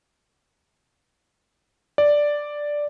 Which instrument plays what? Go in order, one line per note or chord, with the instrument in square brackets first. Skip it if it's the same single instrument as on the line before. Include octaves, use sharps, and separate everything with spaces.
[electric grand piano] D5